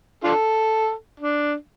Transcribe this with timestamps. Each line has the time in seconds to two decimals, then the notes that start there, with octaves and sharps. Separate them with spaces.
0.24 D4 F4 A4
1.20 D4